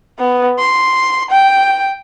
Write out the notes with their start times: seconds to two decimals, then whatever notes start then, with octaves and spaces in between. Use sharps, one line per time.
0.18 B3
0.59 C6
1.30 G5